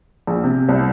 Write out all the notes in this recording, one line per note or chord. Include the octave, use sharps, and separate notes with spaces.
A#1
C3
C2